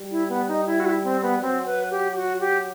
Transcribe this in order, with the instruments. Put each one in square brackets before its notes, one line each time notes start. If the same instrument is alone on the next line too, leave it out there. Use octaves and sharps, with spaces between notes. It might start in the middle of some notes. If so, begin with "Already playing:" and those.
Already playing: [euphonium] G3
[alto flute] E4
B3
D#4
E4
F#4
E4
C4
B3
[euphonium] F#3 [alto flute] C4
[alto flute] B4
G4
F#4
G4